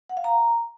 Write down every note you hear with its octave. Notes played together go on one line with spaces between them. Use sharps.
F#5
F5
A#5